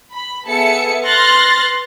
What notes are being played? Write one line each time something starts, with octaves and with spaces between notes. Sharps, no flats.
B5
B3 G#4 A4 E5 A5 C#7
B4 C6 F6 F#6 A6 A#6